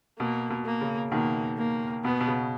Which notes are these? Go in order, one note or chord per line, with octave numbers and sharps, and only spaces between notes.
B2 A#3
B2
A#3
C#3
B2 D#3 A#3
A#3
B2 B3
B2
C#3